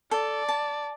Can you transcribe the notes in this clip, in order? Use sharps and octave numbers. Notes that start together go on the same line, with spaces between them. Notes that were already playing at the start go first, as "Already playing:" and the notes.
A4 D5
A5